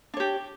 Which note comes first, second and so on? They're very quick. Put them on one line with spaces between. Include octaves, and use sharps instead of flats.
D4 C#5 G4